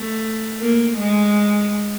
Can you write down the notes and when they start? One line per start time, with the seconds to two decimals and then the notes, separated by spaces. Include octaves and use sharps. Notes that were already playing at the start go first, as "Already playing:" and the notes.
Already playing: A3
0.60 A#3
0.97 G#3